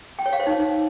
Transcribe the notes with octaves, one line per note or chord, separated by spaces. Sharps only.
G5
C#5
F5
C5
D#4